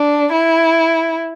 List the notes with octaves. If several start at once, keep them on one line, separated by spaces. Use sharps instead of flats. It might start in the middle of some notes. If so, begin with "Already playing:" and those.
Already playing: D4
E4